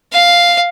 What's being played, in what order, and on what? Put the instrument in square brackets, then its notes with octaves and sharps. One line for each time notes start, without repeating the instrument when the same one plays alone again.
[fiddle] F5